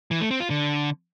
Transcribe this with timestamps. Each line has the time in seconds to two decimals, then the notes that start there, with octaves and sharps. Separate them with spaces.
0.11 E3
0.21 A3
0.31 C4
0.40 F4
0.50 D3